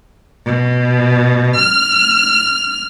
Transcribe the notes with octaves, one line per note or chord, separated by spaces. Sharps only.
B2
F6